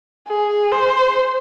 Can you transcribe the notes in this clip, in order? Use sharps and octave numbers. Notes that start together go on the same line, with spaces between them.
G#4
C5